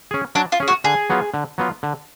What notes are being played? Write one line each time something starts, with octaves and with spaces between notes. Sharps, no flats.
C#4 G#4
F#3 D4
F4
C#4 G#4
F#4
D3 G#4
F#3 B3 F4
D3
F#3 B3 F4
D3